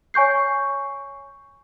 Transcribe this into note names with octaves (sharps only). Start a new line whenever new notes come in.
C#5 G#5 C#6 G6 C7